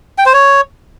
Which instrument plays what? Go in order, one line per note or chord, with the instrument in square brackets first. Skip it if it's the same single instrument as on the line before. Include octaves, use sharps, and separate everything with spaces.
[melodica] G5
C5
C#5